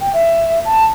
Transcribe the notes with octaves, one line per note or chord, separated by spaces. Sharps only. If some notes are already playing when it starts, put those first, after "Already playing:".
G5
E5
A5